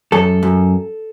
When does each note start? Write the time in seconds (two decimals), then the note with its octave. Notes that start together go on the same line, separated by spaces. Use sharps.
0.12 F#2 A4
0.43 F#2